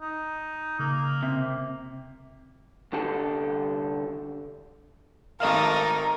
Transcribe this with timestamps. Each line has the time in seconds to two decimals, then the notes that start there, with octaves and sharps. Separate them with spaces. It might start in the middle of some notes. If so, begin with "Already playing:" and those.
0.01 D#4
0.79 C#3 A#3
1.23 C3
2.92 C2 D3 G4 A4
5.40 G#1 A3 D#4 A#4 D#5 F5 A#5